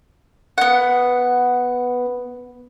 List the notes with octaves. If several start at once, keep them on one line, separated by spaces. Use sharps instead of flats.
B3 F#5